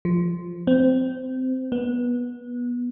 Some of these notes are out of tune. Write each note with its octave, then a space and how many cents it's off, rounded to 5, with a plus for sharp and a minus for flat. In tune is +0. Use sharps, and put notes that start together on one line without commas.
F3 -5
C4 -20
B3 -20